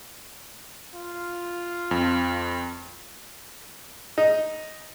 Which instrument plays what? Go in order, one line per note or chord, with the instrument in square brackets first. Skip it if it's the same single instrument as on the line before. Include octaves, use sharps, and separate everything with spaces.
[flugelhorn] F4
[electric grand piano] F2
[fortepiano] D#4